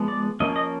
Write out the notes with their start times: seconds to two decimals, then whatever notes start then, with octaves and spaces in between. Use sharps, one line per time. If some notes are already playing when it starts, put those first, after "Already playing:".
Already playing: F3 G#3 B3
0.08 D5
0.40 F3 A#3 C#4 D#5
0.56 D#5